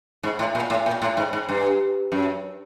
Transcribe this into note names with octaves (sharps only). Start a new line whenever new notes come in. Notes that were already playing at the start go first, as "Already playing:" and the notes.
G#2
A2
A#2
A2
A#2
A2
G#2
G#2
G2
F#2